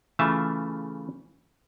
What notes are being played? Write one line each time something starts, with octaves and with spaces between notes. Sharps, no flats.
C#3 E3 A3 F4 E5 A5